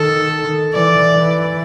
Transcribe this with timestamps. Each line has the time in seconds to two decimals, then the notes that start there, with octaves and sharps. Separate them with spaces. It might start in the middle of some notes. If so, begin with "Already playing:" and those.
Already playing: D#3 A4
0.73 E3 D5
1.15 E3